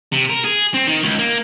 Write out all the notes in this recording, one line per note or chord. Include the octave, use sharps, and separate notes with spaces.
C3
A#4
G#4
C4
D#3
C#2
A#3